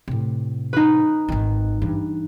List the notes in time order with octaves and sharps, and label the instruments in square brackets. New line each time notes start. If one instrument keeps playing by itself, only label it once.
[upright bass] A2 C3
[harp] D#4 B4
[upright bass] G#1 D#3
G2 E3